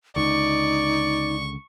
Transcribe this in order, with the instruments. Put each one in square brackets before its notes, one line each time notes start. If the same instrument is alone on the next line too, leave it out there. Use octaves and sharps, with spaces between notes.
[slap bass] C#2 D3 [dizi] D#4 [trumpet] D5 [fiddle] C#6